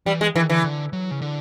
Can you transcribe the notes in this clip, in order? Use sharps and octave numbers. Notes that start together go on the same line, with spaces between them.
E3 G3
G#3
D#3 E3
D3 E3
D3
F#3
C#3
D3